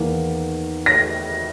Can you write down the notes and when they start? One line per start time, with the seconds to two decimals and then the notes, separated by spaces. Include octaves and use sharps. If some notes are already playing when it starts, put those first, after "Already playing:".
Already playing: E2 D#3 A#3
0.86 A#6